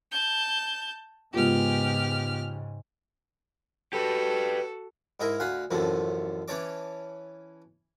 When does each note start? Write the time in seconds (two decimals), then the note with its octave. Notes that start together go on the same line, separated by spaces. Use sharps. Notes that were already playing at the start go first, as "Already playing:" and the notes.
0.11 A5 G6
1.34 G#2 C#3 G#3 B3 F4 G4 F6
3.93 F#4 G4 A4 B4
5.20 G#2 D#4 E4 G#4 A#4
5.40 D2 F5 F#5 G#5 B5
5.71 A1 F#2 C3 F3 A3
6.48 E3 C#4 C#5 A5 D6